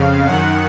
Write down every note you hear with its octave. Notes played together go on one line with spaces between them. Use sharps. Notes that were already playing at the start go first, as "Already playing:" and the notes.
Already playing: F2 C#3 F5
F#2 D#3 F#5